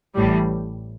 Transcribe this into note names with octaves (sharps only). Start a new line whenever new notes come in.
A1 A2 E3 G3